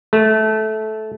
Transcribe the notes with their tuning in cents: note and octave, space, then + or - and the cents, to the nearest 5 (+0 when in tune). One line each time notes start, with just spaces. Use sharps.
A3 -15